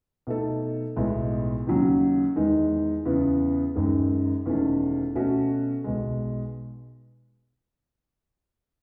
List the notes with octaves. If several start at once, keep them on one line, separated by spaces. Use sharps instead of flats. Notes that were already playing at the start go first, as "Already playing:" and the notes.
B2 A3 D#4 A4
B1 A2 G#3 B3 E4
D#2 C#3 F#3 C#4
E2 D#3 G#3 D#4
E2 C#3 E3 B3
F#2 D#3 G#3
E1 E2 D#3 A3 C#4
B2 A3 C#4 F#4
B1 B2 G#3